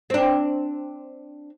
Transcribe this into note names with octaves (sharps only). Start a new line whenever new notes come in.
C4 D4